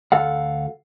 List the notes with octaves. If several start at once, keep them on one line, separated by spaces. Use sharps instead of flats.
D2 A4 F5 F#5